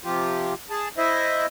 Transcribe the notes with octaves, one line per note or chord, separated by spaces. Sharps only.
C3 F3 F4 G4
G#4 A5
E4 C5 D#5 E5